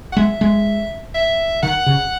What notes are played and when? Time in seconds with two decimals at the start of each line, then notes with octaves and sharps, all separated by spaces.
0.12 F#5
0.17 G#3 E5
0.41 G#3
1.14 E5
1.62 D#3 F#5
1.86 C#3